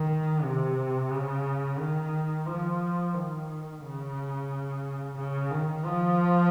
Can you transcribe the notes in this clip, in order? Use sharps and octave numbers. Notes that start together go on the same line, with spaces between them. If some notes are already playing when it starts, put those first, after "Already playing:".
Already playing: D#3
C3
C#3
D#3
F3
D#3
C#3
C#3
D#3
F3